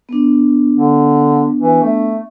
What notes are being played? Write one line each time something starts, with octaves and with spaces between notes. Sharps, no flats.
B3 D4
D3
E3
A3